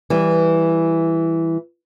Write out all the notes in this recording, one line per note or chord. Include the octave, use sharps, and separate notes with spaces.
E3 G3